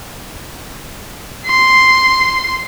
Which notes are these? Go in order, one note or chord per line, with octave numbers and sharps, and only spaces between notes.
C6